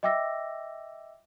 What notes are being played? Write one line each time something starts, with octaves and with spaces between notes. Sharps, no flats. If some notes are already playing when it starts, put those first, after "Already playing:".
D#5 E5 G5 D6 E6 A#6